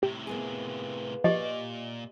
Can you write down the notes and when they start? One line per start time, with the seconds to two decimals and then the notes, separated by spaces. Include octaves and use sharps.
0.03 A2 C3 G4
0.27 A#3 B3 G#4
1.24 A#2 F3 G4 D5 D#5